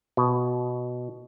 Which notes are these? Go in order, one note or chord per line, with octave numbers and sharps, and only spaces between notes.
B2